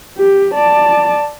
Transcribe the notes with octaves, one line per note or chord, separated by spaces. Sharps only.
G4
D5 A5